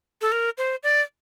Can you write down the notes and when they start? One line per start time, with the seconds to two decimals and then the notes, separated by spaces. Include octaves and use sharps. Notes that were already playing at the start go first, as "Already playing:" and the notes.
0.22 A4
0.32 A#4
0.58 C5
0.83 D5